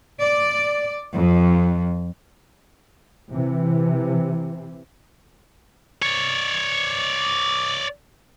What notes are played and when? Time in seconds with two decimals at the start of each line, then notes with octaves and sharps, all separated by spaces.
0.21 D5
1.15 F2
3.33 C3 E3
6.02 C#5 D5